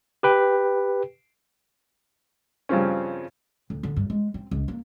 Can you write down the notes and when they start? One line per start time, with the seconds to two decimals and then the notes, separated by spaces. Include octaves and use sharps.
0.23 G4 B4 G5
2.69 G2 C#3 F3 C4 C#4
3.70 D2
3.83 D3
3.96 G2
4.10 G#3
4.34 C4
4.51 C#2
4.68 A#3